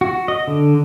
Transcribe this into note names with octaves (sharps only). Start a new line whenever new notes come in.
F#4
D#5
D3